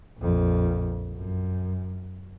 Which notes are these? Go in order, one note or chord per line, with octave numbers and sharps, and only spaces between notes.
A#1 F2
F#2